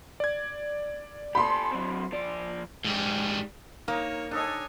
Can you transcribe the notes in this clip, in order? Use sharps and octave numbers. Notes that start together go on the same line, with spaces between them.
D5 G#6
G4 A4 B5 C6
F#3 C4
F3 D5
G#2 G3
A#3 D#4 A#4 C#5
D4 D#4 A4 C#5 D#5 G#5